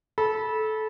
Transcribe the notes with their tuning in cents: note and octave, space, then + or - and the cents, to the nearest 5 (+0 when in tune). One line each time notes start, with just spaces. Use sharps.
A4 -20 B5 -20